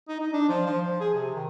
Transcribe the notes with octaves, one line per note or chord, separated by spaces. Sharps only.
D#4
D#4
D4
F3
F3
F3
G#4
C3
D#3